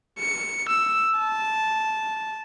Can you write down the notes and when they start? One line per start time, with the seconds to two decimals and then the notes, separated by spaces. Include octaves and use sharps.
0.19 C#7
0.69 E6
1.19 A5